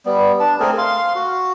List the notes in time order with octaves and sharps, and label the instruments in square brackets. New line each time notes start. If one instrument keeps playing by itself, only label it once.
[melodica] G3 B3
D4 A5
A3 C4 G#4 A#4
F5 C6
F#4